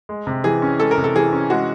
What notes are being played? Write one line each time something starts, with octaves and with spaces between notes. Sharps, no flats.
G#3
C3
E3 G#4
C#4
G#3 A4
A#4
C3
A4
E3 G#4
C#4
G#3 F#4